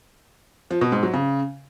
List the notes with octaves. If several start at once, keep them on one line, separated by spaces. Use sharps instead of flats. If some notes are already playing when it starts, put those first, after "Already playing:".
F3
B2
G#2
F#3
C#3